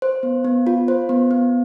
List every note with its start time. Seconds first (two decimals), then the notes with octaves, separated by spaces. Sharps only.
0.02 C5
0.23 B3
0.44 B3
0.67 F4
0.88 C5
1.09 B3
1.31 B3